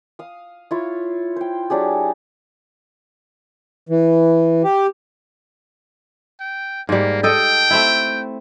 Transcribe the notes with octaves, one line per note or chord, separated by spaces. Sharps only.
F5 D#6
E4 F4 C#5
C5 G5
F#3 D4 G4 G#4
E3
G4
G5
G#2 G3 A#3
A4 D#5 G5
A3 C4 E4